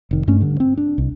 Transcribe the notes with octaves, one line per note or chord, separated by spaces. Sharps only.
F1 D#3
G2 A3 C#4
G2 D3
C4
D4
C2